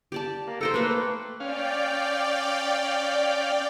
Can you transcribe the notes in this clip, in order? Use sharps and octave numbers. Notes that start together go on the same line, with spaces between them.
G4 D5 A5
A#3
A4 C5 G5 A#5
A3 A#3 B4 C5
C#4 D5 F5 G5